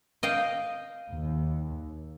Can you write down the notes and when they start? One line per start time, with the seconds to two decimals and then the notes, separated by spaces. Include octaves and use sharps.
0.23 D#5 F5 G5
1.10 D#2